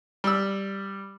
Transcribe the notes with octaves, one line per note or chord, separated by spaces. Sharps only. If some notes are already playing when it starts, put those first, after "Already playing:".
G3 E6